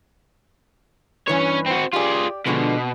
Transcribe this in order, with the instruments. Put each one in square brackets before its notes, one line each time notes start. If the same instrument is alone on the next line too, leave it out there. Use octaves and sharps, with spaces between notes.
[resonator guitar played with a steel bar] G2 E3 B4 [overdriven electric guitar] C#4 C#5
[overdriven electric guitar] C4 F#4
[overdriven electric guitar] F4 G#4 [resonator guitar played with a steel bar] G4 D5
[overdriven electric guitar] B2 [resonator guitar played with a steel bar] D3 F3 G#3